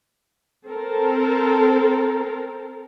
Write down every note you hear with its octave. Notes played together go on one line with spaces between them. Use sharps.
C4 A4 A#4